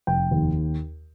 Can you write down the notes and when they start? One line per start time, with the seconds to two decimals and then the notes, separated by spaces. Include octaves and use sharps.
0.07 F1 G5
0.31 D#2